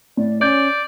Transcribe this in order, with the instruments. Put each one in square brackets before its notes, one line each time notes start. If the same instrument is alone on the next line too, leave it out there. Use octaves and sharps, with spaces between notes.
[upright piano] A2 [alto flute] D5
[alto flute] C#4 [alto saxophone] D5 [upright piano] G6